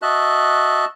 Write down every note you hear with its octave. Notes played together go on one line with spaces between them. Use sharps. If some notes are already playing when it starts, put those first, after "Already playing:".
F#4 D#5 E5 A5 F#6